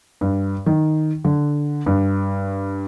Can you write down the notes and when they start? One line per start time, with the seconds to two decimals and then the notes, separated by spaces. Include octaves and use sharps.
0.21 G2
0.66 D#3
1.25 D3
1.86 G2